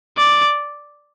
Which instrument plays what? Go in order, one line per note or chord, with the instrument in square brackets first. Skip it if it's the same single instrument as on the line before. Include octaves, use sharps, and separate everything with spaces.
[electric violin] D5